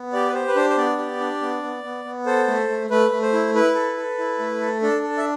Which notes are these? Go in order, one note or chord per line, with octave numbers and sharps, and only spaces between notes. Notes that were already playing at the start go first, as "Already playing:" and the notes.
Already playing: B3
G4 D5
B4
G4 C5
B4
D4 C5
C5
B3 D5
G4
D4
B3
B3
B3
B3
A4 C5
A3
A3
A3 B4
A3
C5
E4
E4 B4
A4
A4
E4
A3
A4
D4 A4
A4
E5